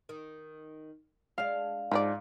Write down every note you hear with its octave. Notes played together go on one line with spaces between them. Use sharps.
D#3
G#3 D4 F5
G#2 F3 B4 D5